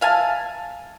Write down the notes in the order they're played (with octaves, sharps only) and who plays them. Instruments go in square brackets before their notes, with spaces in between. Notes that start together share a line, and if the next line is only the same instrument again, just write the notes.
[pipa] E5 F5 G#5 A5